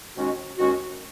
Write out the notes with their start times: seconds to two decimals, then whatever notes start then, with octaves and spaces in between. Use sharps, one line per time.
0.16 D#2 D#3 G#3 C#4 F#4
0.58 D#2 D#3 G#3 C#4 F#4